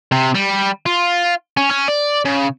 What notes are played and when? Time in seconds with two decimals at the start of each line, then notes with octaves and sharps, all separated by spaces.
0.12 C3
0.35 G3
0.86 F4
1.57 C#4
1.71 C#4
1.88 D5
2.25 C#3